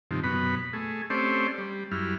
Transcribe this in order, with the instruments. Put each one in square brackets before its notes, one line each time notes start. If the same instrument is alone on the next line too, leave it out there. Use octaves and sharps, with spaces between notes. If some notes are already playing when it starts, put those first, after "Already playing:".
[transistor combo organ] G2 C3 D#3 F3
F#2 B2 B3 B5
A3 G#4
A3 C4 C#4 G4 C5 D5
G3
F#2 G3 E4 F6